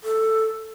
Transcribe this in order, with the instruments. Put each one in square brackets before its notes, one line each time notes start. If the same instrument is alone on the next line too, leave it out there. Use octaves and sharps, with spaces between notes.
[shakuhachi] A4